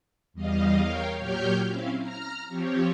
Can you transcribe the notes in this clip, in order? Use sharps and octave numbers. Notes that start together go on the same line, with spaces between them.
E2 G3 D#5 F5
A#4 C#5 F5 G5
A#2 F#3 G4 C#5 F6 G6
C4 C#4 E4 F5
A#5 F6
F3 C4 G4 C#5